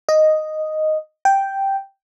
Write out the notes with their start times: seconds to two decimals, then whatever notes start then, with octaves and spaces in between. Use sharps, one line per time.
0.09 D#5
1.25 G5